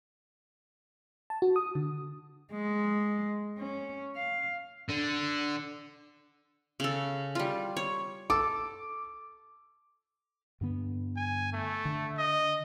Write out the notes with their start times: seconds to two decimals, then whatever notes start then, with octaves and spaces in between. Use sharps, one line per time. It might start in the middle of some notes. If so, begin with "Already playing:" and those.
1.30 A5
1.42 F#4
1.56 D#6
1.75 D3
2.52 G#3
3.58 C#4
4.16 F5
4.90 D3
6.80 C#3 A4
7.35 G3 F4
7.77 C#5
8.30 A4 D6
10.61 G2 D3 B3
11.17 G#5
11.53 A3
11.85 D3
12.18 D#5